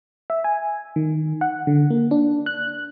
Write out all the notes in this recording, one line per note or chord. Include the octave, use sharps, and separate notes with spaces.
E5
G#5
D#3
F#5
D3
A#3
D4
F#6